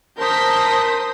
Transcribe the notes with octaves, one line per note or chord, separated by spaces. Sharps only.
A#4 C5 A5 D#6 G6 B6